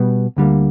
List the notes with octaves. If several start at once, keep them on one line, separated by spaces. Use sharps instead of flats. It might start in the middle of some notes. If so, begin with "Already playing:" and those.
Already playing: B2 G3 B3
D2 D3 G3 A#3